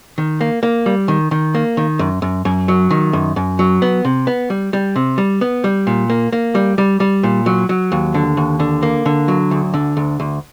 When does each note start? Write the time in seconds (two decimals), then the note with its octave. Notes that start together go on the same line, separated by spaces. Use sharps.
0.18 D#3
0.41 A#3
0.63 A#3
0.86 G3
1.08 D#3
1.31 D#3
1.55 A#3
1.77 D#3
1.99 F#2
2.22 F#2
2.45 F#2
2.68 F#3
2.91 D#3
3.13 F#2
3.36 F#2
3.59 F#3
3.82 B3
4.05 C3
4.27 B3
4.50 G3
4.73 G3
4.96 C3
5.18 G3
5.41 B3
5.64 G3
5.87 A#2
6.10 A#3
6.32 A#3
6.55 G3
6.78 G3
7.00 G3
7.23 A#2
7.46 F#3
7.69 F#3
7.92 D#2
8.14 D3
8.37 D#2
8.60 D3
8.83 A#3
9.06 D3
9.28 F#3
9.51 D2
9.74 D3
9.97 D2
10.20 D2